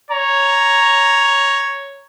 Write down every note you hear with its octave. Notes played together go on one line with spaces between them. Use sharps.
C#5 A#5